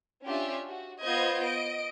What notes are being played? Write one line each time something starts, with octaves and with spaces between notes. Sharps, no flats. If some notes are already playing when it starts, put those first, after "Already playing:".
C#4 D4 F4 G4 E5
F#4
B3 F4 C5 D#5 G6 G#6
D#5 D7